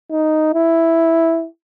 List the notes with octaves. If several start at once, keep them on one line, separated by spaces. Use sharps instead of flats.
D#4
E4